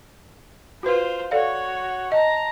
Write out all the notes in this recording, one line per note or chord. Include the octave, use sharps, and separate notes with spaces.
F4 F#4 B4 C5
F#4 A4 C#5 D5 F5
D#5 A5 A#5